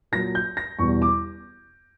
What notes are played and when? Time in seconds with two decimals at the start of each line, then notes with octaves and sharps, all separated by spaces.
0.12 A#2 F#3 A#6
0.35 G6
0.57 A#6
0.79 E2 B2 G3 C#6
1.02 D6